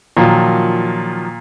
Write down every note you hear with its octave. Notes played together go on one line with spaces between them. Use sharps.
A#2 D#3 F3 F#3